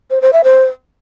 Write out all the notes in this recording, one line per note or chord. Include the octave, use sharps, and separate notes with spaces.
C5
C5
E5
C5